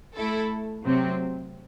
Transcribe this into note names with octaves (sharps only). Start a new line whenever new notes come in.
A3 E4 A4
C3 F#3 C4